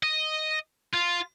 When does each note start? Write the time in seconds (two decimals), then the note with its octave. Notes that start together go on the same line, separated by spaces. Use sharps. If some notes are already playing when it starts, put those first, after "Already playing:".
0.03 D#5
0.93 F4